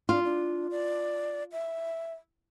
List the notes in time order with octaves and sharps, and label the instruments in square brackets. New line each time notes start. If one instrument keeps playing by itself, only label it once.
[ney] D4 [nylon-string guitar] F4
[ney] D4
D5
E5